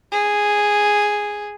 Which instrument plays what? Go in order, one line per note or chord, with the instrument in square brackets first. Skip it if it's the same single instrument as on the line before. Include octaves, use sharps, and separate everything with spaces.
[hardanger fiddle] G#4